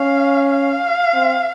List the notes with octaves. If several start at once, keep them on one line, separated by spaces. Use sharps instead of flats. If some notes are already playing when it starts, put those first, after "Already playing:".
Already playing: C#4 F5
F5
C4